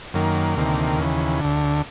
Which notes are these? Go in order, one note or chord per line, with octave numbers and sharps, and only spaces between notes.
F#2 D#3 A#3
D2 C3 D#3
D#2 C#3 E3
D2 D3